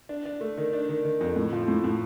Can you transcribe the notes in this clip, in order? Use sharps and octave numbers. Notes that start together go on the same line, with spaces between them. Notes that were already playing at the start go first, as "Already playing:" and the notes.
D4
D4
A3
D#3
D4
D#3
D#3
F2
A2
F3
A2
A2